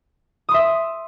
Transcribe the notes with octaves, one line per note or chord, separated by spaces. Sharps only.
E5 C6 D#6